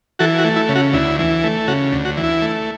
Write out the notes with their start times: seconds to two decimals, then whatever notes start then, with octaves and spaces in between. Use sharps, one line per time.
0.19 E3 F#4 A4
0.38 F#4
0.44 A3
0.56 E4
0.69 C#3
0.75 F#4
0.93 D2 E4
1.19 E3
1.44 A3
1.68 C#3 F#4
1.93 D2
2.05 F#4
2.17 E3
2.24 E4
2.42 A3